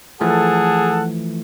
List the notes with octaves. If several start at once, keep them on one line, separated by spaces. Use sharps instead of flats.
E3 F3 A3 G#4 A4 F#5 A5